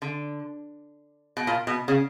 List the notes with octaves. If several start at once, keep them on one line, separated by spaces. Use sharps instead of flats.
D3
B2
A#2
B2
C#3